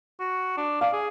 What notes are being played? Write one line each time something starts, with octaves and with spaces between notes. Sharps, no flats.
F#4
D4
D5 F5
G#4